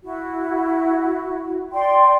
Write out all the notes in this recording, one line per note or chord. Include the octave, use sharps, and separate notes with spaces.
E4 F#4
D5 G5 C6